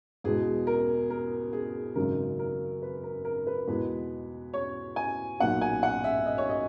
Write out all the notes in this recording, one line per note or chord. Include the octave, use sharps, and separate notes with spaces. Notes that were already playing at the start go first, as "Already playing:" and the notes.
E2 B2 G#3 G#4
A#4
A#4
G#4
G#1 F#2 C#3 G#3 A#4
A#4
B4
A#4
A#4
B4
E2 B2 G#3 B4
C#5
G#5
B1 A#2 F#3 F#5
G#5
F#5
E5
D#5
C#5
D#5